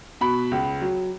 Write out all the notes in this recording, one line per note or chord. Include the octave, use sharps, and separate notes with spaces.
B2 B5
C#2
F#3